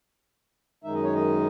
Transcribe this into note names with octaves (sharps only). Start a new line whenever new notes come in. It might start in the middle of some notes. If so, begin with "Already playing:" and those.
F#2 D#3 G#3 D#4 E5
D#5
C#5
D#5